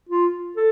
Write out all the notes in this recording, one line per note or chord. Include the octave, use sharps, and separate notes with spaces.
F4
A4